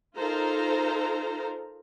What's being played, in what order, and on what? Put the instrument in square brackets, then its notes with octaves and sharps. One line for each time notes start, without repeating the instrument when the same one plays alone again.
[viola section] D#4 F4 A4 A#4 C5 A#5